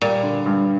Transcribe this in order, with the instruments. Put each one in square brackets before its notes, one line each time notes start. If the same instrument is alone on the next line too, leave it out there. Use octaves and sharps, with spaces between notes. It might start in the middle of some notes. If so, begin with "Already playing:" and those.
[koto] A#2 [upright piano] G3
[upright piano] D3
G2